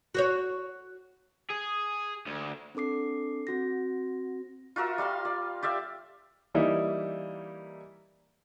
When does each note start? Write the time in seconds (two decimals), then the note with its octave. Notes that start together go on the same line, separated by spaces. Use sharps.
0.15 F#4 C5 C#5
1.50 G#4
2.27 D2
2.75 C4 D4 A4 D6 C7
3.47 C4 F#4 A#6
4.76 F4 F#4 A#4 E5
4.98 G3 F4 F5 C6
5.25 D5
5.62 G4 D5 E5 F5
6.54 E3 G3 A#3 D#4 E4